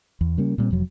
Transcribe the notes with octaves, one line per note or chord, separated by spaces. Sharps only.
E2
C#3 G3 A#3 C#4
A#2 G3 B3 C4
F1 F2 F#3